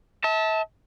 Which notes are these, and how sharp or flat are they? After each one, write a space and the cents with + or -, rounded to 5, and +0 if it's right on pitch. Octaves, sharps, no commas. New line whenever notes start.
E5 -35 A5 +0